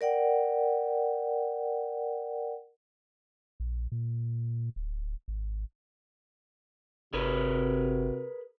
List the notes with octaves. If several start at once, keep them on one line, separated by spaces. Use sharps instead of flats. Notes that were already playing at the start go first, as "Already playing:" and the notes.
A#4 D5 F#5 G5
A#1
A#2
D1
G#1
G1 C3 F#4 G#4 A#4 B4